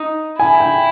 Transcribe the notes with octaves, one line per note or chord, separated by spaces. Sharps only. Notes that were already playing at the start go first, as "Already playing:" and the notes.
Already playing: D#4
E4 G#5
G5